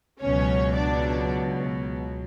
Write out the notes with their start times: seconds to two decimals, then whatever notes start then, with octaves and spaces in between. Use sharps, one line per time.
0.21 C#2 B2 F#3 C#4 C#5
0.75 D4 D5